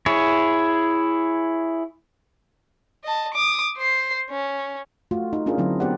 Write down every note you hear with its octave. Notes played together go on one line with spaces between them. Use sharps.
E4 G#4 C#5
D#5 A5
D6 D#6
C5 C7
C#4
A3 F4 F#4
D#4
C#4 D4 F4 G#4 A#4
D3 F#3 C4 E4
B3 D4 G4 C5 D5 F#5